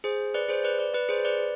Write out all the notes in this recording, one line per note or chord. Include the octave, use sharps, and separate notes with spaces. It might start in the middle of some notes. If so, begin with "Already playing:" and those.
G#4 C5
B4 D5
G#4 C5
B4 D5
B4 D5
B4 D5
G#4 C5
B4 D5